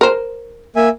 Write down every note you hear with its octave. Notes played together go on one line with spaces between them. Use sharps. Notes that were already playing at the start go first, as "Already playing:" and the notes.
A#4 C5
A#3 E5 G#5